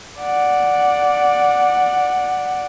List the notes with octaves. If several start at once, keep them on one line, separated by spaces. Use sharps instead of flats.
D5 F#5